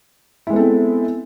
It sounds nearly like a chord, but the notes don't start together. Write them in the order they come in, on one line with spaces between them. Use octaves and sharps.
E4 G#3 B3 A4 C4